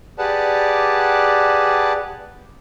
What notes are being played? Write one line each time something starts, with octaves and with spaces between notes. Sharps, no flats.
G4 G#4 B4 D5 F#5 A5